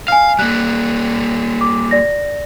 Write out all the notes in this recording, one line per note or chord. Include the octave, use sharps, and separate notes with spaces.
F5 G#5 F6
G3 A#3 F#6
D6
D5 A#6